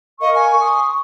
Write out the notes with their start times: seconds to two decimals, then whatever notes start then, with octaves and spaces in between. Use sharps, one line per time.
0.21 A#4 D#5 F5 C#6
0.35 G#5
0.61 C6 C#6 D#6